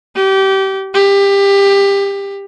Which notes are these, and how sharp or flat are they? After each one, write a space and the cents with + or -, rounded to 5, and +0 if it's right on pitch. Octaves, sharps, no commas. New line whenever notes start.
G4 -25
G4 +20